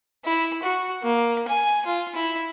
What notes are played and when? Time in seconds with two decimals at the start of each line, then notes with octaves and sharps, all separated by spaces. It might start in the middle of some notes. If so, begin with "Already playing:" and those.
0.25 E4
0.63 F#4
1.03 A#3
1.48 G#5
1.86 F4
2.15 E4